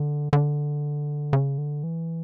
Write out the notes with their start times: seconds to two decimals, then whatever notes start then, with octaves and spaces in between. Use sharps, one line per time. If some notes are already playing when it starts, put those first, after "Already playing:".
Already playing: D3
0.33 D3
1.33 C#3
1.58 D3
1.84 E3